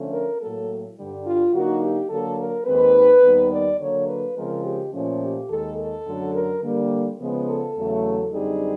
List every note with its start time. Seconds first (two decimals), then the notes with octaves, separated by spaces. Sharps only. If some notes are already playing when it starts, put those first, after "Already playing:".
Already playing: D3 F3 A3 C#4
0.12 A#4
0.40 A2 F#3 A#3 A4
0.97 G2 D3 G3
1.25 F4
1.53 D3 F#3 A#3 D#4 F#4
1.81 G4
2.09 D3 F#3 A#3 A4
2.39 A#4
2.66 D#2 D#3 G#3 C4 B4
3.23 D#2 D#3 G3 B3 D#4
3.51 D5
3.79 D3 F#3 A#3 C#5
4.08 B4
4.36 C#3 F3 G#3 C4 A#4
4.64 G4
4.93 A#2 F3 A3 C#4
5.22 G4
5.50 D#2 D#3 G#3 A4
5.78 A4
6.07 F#2 D3 F#3 A3
6.35 A#4
6.62 D3 G3 A#3
7.20 C#3 F3 G#3 B3
7.47 A4
7.76 E2 C#3 F#3 A3
8.33 F#2 D3 G3 C4 D#4 G#4